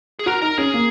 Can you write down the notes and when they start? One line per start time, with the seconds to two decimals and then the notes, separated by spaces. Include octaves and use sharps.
0.19 G#4
0.26 F#4 A#4
0.42 D#4 A#4
0.58 C#4 G#4
0.74 A#3